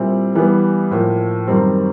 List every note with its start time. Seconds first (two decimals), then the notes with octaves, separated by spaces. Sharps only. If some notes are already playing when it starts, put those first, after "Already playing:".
Already playing: A#2 G3 C4 E4
0.35 E3 G3 B3
0.91 A2 F3 A#3
1.47 F#2 D#3 G3 C4